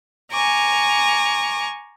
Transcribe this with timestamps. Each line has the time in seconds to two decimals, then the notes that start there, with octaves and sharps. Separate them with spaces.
0.32 G#5 A#5 C#6 D6